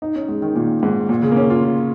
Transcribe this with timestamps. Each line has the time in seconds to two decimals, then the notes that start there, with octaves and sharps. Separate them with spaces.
0.02 D#4
0.16 C#4
0.28 G#3
0.42 D#3
0.55 A#2
0.83 G#2
1.09 A#2
1.23 C#3
1.31 A#3
1.36 C#4
1.50 F4
1.64 F4